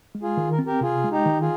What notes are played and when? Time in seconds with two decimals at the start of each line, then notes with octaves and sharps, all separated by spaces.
0.15 G#3
0.22 F4 G#4
0.37 D#3
0.52 A#4
0.59 C4
0.66 G4 A#4
0.81 C3 F4 G#4
1.04 G#3
1.11 D#4 G4
1.26 D#3
1.41 F4 G#4